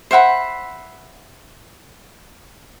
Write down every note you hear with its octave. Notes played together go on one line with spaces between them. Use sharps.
C5 E5 F#5 B5